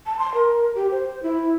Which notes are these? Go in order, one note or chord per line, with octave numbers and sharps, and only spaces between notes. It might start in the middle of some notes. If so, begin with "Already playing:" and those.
A5
C6
A#4
G4
C5
E4